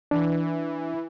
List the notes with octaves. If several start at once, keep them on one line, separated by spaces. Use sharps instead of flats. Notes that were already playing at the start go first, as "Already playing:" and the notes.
E3 D4